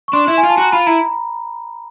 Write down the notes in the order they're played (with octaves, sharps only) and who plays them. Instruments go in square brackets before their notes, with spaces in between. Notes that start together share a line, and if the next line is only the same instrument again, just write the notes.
[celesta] C#6
[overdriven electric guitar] D4 [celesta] C6
[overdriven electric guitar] E4
[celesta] G#5
[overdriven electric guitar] F4
[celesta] A5
[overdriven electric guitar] F#4 [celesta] A#5
[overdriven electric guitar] F4 [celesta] B5
[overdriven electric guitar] E4 [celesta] A#5